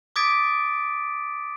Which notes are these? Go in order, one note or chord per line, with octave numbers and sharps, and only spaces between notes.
D6 D#6 G#6 A6 B6 D7